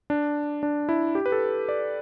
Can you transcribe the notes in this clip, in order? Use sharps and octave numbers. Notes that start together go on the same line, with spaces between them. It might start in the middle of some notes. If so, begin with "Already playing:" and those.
D4
D4
E4
G4
B4
A4
D5